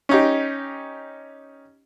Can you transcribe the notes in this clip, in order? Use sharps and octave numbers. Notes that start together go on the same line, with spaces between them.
C#4 D#4 G4